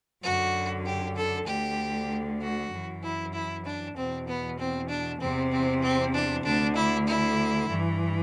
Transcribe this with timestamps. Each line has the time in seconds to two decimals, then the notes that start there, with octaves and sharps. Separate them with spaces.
0.23 F#2 D3 F#4
0.85 G4
1.16 A4
1.47 D2 D3 G4
2.41 F#4
2.71 F#2 E3
3.03 E4
3.34 E4
3.65 D4
3.95 E2 B2 C4
4.27 B3
4.58 C4
4.89 D4
5.20 E2 C3 E3 C4
5.51 C4
5.82 C4
6.13 D4
6.44 D2 D3 D4
6.75 E4
7.06 E4
7.68 G2 E3